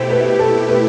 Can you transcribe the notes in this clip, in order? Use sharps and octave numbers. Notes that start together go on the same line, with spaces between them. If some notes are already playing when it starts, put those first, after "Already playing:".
Already playing: B2 A3 E4 G4 C5
B4
A4
B4